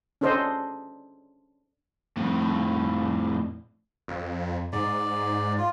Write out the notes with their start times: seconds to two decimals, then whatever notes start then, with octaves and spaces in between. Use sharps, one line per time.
0.21 C#4 D4 A4 C5 D#5
2.17 F2 A2
4.08 F2
4.73 G#2 D5
5.58 F4